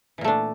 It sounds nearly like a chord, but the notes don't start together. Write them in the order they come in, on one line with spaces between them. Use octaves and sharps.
E3 A#2 A3 D4